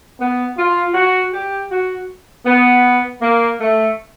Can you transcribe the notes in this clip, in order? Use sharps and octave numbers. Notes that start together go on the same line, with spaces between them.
B3
F4
F#4
G4
F#4
B3
A#3
A3